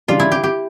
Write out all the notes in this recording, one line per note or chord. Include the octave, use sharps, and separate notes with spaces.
C#3 E3 G3 D4 F4
E4
G4
G4